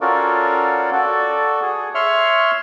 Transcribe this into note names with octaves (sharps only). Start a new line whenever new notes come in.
C#4 F4 F#4 A4 A#4 D5
F#4 A4 D5
G#4
C#5 E5 C6 C#6 F6